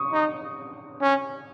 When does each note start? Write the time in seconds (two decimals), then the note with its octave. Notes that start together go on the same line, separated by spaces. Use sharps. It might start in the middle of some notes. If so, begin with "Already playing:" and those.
Already playing: C#6 D#6
0.13 D#4
1.01 C#4